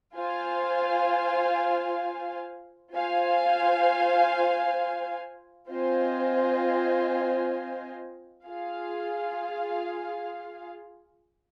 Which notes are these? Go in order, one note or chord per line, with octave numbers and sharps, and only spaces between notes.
F4 C5 F5 G#5
F4 C5 F5 G#5
C4 F4 C5 D#5 G#5
F4 G#4 F5